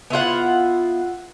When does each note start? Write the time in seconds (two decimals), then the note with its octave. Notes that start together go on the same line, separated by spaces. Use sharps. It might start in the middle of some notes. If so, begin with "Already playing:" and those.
0.10 B3 E4 F4 F#5